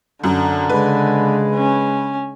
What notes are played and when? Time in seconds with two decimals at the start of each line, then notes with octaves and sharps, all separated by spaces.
0.24 F#2 D3
0.69 C#3 G#3 B4
1.55 C#4